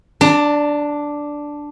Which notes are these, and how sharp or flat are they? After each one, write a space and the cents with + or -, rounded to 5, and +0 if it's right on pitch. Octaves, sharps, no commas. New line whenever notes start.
D4 +0 A#5 -45